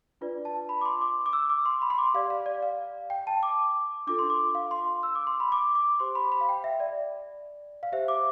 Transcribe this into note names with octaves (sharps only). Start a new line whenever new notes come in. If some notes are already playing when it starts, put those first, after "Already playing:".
D4 F4 B4 D5
A5
B5
D6
C6
D6
D6
E6
D6
C6
B5
C6
D6
G4 D5 F5
F5
D5
F5
G5
A5
D6
D4 F4 A4 D6
C6
D6
F5
C6
E6
D6
C6
B5
D6
D6
G4 C5 C6
B5
B5
F5
G5
E5
D5
F5
G4 C5 E5
D6